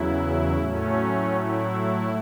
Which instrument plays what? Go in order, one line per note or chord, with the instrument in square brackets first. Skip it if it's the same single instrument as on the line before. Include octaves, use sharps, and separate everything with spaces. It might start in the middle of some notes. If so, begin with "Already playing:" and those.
Already playing: [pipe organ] E2 C#3 F#3 E4
A2 F#3 A3 C#4
E4